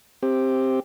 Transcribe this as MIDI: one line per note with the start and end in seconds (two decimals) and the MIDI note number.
0.23 0.80 60
0.23 0.80 67